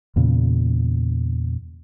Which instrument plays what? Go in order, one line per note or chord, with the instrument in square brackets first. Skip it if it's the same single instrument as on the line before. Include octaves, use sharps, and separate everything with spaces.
[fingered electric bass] E2 A#2 C#3